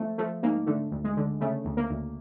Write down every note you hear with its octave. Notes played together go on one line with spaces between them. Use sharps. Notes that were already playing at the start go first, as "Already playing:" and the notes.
Already playing: F3 A3
F3 A3
G#2 A#3
D3 A3
D2
G#3
D3
C#3 A3
D2
A#3
D2